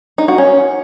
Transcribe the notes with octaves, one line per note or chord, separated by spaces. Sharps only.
D#4
F#4
C#4